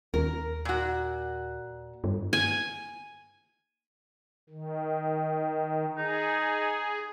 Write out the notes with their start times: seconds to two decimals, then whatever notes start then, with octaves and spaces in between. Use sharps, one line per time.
0.14 D#2 A#4
0.65 A#2 F#4
2.04 G2
2.33 G#5
4.50 D#3
5.97 D#4 G#4